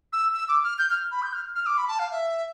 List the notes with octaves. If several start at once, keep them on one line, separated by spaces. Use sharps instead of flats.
E6
E6
D6
F6
G6
F6
B5
G6
F6
F6
D6
B5
A5
F5
E5